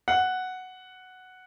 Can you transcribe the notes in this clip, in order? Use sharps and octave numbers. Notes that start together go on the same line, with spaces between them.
F#5